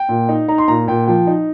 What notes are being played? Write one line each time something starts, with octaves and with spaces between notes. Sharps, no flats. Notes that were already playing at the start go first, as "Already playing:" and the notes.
Already playing: G5
A#2
D#4
D#4 A#5
C6
A#2 A#5
A#2 G5
F3 G5
D#4